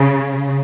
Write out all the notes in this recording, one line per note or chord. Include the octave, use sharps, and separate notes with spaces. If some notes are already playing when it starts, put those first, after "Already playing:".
Already playing: C#3